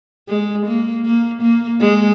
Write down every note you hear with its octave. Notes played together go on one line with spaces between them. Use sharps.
G#3
A#3
A#3
A#3
G#3